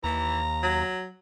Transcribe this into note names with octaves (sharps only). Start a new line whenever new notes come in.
D#2 E3 A#5
F#3